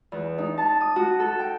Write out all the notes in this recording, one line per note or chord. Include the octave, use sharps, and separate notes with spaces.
E2
D#4
A5
D#6
F#4
A4
G5